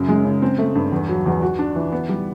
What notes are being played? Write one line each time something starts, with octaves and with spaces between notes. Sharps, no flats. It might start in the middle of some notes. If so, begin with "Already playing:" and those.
Already playing: F#2 C#3
G#3
C#3
C4
A3
G2
E2
F#3
E2
F#4
D4
E3
B3
G3